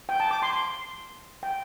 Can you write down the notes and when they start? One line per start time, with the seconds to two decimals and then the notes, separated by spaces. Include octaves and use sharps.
0.09 G5
0.20 A5
0.31 D6
0.42 C6
0.53 C6
1.43 G5